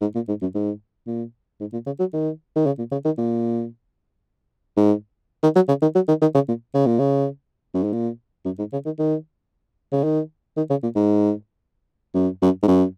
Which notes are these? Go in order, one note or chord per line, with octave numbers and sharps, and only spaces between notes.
G#2
A#2
G#2
F#2
G#2
A#2
G#2
A#2
C#3
F#3
D#3
D#3
C#3
A#2
C#3
D#3
A#2
G#2
D#3
F#3
C#3
D#3
F#3
D#3
D#3
C#3
A#2
C#3
A#2
C#3
F#2
G#2
A#2
F#2
G#2
C#3
D#3
D#3
C#3
D#3
D#3
C#3
A#2
G#2
F#2
F#2
G#2
F#2